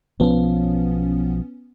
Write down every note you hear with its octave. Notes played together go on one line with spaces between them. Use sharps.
B1 F3 B3 C#4